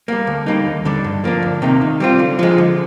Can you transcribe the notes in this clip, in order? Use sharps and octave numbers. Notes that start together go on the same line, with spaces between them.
G3 A#3
D2
D3 G3 A#3 D#4
D#2
D3 G3 D4
G2
F3 A#3 D4
D2
C3 D#3 A#3 D#4
D#3
G3 C4 F4
D3
F3 G#3
D3